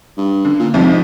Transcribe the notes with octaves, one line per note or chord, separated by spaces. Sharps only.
G2
D3
A#2
C2 F2 G#2 F3